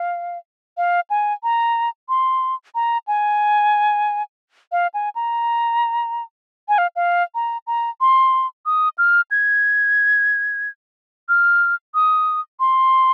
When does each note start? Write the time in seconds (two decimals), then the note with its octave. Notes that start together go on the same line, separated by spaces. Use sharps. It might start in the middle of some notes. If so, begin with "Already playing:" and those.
Already playing: F5
0.77 F5
1.10 G#5
1.43 A#5
2.09 C6
2.75 A#5
3.07 G#5
4.72 F5
4.94 G#5
5.15 A#5
6.69 G#5
6.78 F5
6.96 F5
7.35 A#5
7.67 A#5
8.01 C6
8.66 D#6
8.98 F6
9.31 G#6
11.29 F6
11.95 D#6
12.60 C6